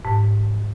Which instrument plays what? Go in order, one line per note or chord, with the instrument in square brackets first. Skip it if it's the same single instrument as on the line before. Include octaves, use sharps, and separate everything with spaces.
[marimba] G#2